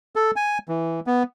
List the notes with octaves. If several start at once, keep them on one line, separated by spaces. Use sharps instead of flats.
A4
G#5
E3
B3